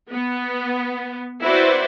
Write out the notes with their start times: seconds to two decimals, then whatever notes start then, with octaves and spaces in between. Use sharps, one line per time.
0.11 B3
1.41 C4 E4 F#4 B4 C5 D5